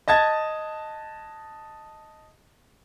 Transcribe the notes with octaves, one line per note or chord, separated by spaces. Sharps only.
D#5 A5 G#6 A6